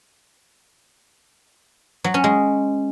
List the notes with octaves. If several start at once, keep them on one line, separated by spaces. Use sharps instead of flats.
F#3
C#4
G#3